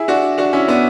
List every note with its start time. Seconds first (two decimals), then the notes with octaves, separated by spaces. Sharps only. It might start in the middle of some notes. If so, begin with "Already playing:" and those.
Already playing: E4 G#4
0.08 D4 F#4
0.38 D4 F#4
0.53 C#4 E4
0.68 B3 D4